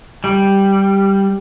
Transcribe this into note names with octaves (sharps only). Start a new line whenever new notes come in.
G3